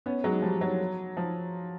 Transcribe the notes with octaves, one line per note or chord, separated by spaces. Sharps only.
B3 C#4
F#3 G#3
F3 G3
F#3
F3